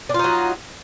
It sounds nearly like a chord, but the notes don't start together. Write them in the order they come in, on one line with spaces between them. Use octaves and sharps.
D4 F4 D#4 F#3